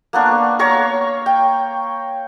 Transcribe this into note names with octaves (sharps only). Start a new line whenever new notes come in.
A#3 B3 D4 C#6
C#5 F5 A#5 C#6
G5